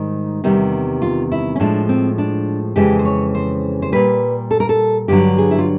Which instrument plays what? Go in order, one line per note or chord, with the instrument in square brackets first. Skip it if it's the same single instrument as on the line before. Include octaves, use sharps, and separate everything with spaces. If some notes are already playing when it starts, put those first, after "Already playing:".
Already playing: [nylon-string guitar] G#2 D#3 G3
E2 C3 D#3 G3
F4
E4
C#4
A2 F3 G#3 D4
C4
D4
F2 C#3 E3 G#3 G4
C5
C#5
C5
C5
A#2 G3 B4
A4
A#4
A4
G2 D3 F#3 G4
G#4
E4
F4